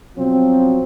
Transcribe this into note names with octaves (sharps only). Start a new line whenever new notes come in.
B2 F3 F#3 C4